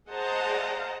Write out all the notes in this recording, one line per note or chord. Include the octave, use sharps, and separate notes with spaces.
G#4 C5 D#5 F#5 A5 A#5